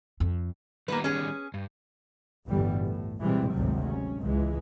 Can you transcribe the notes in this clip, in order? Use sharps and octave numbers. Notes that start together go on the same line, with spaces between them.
F2
D#3 G3 A#3 B3 B4
C#4 G#4
G2
G1 D2 A2 E3 G3 B3
A2
B2 E3 G3 G#3 C4
G#1 D2 A2 C3 F#3 G3
G#2 C#4
C#2 E3 G#3